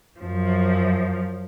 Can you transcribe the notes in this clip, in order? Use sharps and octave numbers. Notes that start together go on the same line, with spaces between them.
F#2 F3